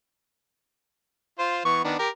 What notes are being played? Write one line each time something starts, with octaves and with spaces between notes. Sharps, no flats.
F4 C5
E3 B3 C#6
D#3 B3 D4
G4 A#4